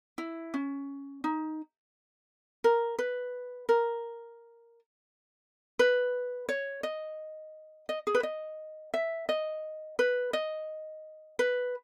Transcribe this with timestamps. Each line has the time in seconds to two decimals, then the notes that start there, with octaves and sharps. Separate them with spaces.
0.18 E4
0.54 C#4
1.24 D#4
2.64 A#4
2.99 B4
3.69 A#4
5.79 B4
6.49 C#5
6.83 D#5
7.89 D#5
8.07 G#4
8.14 B4
8.23 D#5
8.94 E5
9.29 D#5
9.99 B4
10.33 D#5
11.39 B4